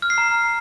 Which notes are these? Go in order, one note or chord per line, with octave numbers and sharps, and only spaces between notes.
F6
C7
A#5